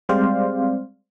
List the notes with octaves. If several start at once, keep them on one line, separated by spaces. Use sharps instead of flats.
G3 G#3 C4 C5 D5 F5